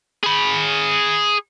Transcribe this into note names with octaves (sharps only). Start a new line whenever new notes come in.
G#4 B5